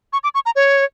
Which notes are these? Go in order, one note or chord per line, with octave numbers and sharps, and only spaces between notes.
C#6
D6
C#6
A#5
C#5